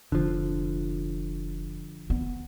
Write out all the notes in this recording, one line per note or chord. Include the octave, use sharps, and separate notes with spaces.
F1 D3 F3
D2 B3